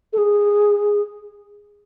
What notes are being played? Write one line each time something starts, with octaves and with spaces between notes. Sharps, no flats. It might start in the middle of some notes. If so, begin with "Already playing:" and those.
A4
G#4